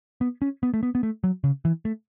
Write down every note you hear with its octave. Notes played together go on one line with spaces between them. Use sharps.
B3
C#4
B3
A3
B3
B3
A3
F#3
C#3
E3
A3